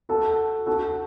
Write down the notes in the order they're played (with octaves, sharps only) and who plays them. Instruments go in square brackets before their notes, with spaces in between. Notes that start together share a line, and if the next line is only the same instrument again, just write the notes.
[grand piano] F#4 A4
F#4 A4